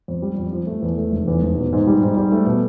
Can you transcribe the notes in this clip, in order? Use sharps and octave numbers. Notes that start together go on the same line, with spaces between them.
F2
G3
F2
F3
A3
E2
A3
F1
E2
F1
B2
G#2
G3
G#2
G3
A3
B2